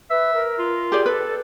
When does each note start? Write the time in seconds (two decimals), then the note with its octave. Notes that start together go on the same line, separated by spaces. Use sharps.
0.10 B4 E5
0.34 A#4
0.59 F4
0.92 G4 G#4 D5 G5
1.06 A4 B4